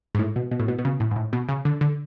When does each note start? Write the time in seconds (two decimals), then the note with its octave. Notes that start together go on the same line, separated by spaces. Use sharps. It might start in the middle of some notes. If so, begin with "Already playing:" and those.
0.15 G#2
0.19 A2
0.36 B2
0.51 B2
0.60 A2
0.68 B2
0.79 B2
0.85 C#3
1.00 A2
1.11 G#2
1.16 A2
1.33 B2
1.49 C#3
1.65 D3
1.81 D3